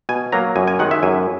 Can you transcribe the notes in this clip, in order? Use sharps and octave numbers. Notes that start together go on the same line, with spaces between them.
B2 G#5
F#3 A#3 A#5
F#2 G#5
G#5
D#3 G#3 F#5
E5
F#2 G#5